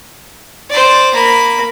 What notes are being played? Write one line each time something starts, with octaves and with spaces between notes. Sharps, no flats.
C5 D5
A#3 B5